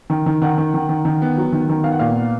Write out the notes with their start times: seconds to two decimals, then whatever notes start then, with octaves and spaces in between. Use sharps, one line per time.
0.10 D#3
0.26 D#3
0.42 D#3 F#5
0.58 D#3
0.74 D#3
0.89 D#3
1.05 D#3
1.22 B3
1.37 F#3
1.52 D#3
1.69 D#3
1.84 B3 F5
1.92 F#5
1.99 A#2 F5
2.17 B3